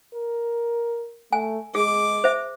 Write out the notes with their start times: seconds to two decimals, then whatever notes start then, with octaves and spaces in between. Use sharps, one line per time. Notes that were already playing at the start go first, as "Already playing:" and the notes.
0.14 A#4
1.33 A3 G#5
1.75 G#3 G#4 D6
2.24 C5 E5